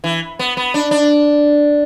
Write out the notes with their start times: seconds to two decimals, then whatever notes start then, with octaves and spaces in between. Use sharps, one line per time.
0.04 E3
0.39 B3
0.57 B3
0.74 D4
0.91 D4